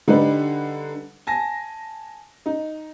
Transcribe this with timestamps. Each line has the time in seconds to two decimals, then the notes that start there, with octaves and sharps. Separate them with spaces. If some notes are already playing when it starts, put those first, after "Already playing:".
0.08 D3 G3 D#4 A4 B4
1.27 G#5 A5 A#6
2.46 D#4